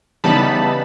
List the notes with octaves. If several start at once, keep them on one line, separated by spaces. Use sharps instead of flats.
C#3 E3 G3 B3 D#4 A5 B5